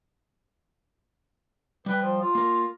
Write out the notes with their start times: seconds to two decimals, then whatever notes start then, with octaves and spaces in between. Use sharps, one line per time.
1.86 G3 B4 G5
2.02 F3
2.21 F4
2.35 A#3 A#4